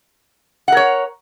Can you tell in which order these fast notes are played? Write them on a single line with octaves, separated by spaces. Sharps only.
F#5 A#4 C#5